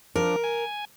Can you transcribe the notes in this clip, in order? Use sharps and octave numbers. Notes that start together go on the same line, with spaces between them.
F3 D4 A#4
G#5